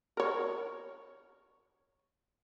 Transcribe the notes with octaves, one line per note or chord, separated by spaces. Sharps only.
A#4 C#5